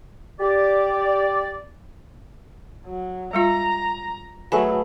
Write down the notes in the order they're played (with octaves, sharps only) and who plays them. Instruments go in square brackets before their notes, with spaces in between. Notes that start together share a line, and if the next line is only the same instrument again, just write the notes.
[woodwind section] G4 D5
[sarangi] F#3
[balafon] G3 G#3 F4 [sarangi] A#5
[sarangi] F#3 [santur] A3 G#4 B4 [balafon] G#5